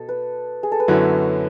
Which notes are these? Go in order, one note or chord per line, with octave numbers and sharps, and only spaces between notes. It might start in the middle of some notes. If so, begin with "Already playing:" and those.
Already playing: B2 A4
B4
G#4
A4
B4
F#2 D3 F#3 B3 E4 C#5